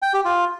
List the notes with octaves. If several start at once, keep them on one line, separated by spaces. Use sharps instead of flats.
G5
G4
F4